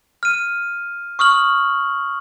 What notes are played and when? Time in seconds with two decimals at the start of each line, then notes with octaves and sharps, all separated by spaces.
0.23 F6 D#7
1.19 C#6 D#6 F6 F#7